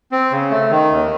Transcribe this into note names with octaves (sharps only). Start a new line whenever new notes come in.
C4
C#3
A3
D#3
D#2